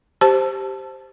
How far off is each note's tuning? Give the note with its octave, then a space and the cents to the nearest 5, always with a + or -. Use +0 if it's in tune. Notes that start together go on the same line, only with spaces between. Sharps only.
G4 +0 C5 +0 A5 +0